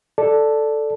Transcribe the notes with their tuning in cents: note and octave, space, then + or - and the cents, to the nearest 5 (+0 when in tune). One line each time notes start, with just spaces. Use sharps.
A4 +0 D5 +0 A5 +0